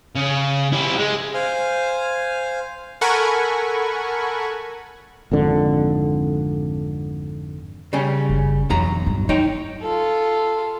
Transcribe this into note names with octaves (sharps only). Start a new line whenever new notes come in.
C#3
E4 G4
G#3
C5 F5 G#5 F6
A4 A#4 F#5 G#5 B5 C#6
G#1 F2 D3
C#3 G3 C#4
F#1
B1 F2 E3 F#3 A#5
G2
D#4 E4 C#5 G5
F4 A4